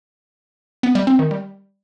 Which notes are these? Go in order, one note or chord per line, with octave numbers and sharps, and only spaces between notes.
B3
G3
C4
D#3
G3